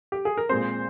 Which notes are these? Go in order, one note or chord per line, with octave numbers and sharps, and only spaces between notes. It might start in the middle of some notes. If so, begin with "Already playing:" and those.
G4
G#4
A#4
A#2 G#3 C4 C5